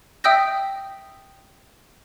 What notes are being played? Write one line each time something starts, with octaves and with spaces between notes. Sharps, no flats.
E5 G5 D#6 E6 G6 A#6